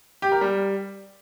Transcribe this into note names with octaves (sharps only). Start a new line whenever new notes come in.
G4
A#4
G3